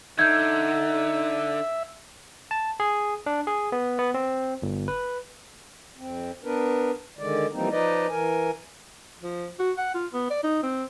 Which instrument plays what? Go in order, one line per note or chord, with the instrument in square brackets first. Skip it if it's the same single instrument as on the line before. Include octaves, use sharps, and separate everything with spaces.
[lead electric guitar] D3 [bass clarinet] D#4 [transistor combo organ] E5 [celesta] G6 G#6
[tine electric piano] A5
G#4
D4
G#4
B3
B3
C4
G1
B4
[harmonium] F2 C4
B3 D4 A#4 B4
D3 D#3 G#3 D5
E3 F3 G3 A#3 C4 D#4
F3 D#4 B4 D5 D#5
E3 A#4 G#5
[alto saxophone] F3
F#4
F#5
F4
B3
D5
D#4
C4